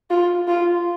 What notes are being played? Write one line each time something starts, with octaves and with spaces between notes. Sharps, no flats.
F4
F4